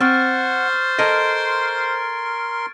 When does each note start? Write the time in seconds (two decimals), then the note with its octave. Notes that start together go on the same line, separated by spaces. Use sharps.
0.01 C4 C5 F#5 C#6 F6 A6
0.99 A4 A#4 D#5 C6 F6 G#6 D7